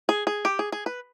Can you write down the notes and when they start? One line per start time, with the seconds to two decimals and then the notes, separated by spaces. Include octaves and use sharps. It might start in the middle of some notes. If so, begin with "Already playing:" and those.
0.09 G#4
0.27 G#4
0.45 G4
0.59 G#4
0.72 G#4
0.86 B4